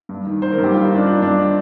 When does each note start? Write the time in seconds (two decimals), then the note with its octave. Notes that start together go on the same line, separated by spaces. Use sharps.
0.09 G2
0.26 D#3
0.42 D#3 C5
0.52 A#4
0.58 G2
0.64 G4
0.73 G2 F4
0.84 D#4
0.90 D#3 D4
1.06 D#3 D4
1.22 G2 D4